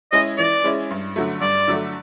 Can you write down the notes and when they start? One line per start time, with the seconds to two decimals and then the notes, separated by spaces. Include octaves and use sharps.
0.12 G#3 C#4 E4 G#4 D#5
0.38 E3 D5
0.64 G#3 C#4 E4 G#4
0.90 G2
1.16 D3 F#3 A3
1.41 G2 D5
1.68 D3 F#3 A3